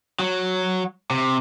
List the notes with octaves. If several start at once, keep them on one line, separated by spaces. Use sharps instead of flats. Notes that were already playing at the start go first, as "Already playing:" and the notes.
F#3
C3